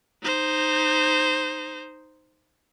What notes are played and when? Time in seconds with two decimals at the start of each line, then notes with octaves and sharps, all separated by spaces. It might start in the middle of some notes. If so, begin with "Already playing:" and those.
0.23 D#4 C5